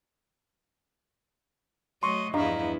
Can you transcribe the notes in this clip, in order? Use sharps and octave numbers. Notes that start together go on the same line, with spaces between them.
F#3 A3 D#5 C6 C#6
E2 G2 F3 E4 D#5 F5 A#5